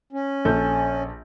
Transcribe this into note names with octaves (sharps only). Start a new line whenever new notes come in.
C#4
A#1 A4 G6